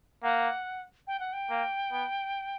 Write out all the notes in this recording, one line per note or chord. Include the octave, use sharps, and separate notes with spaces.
A#3 F#5
G5
F#5
G5
A#3
B3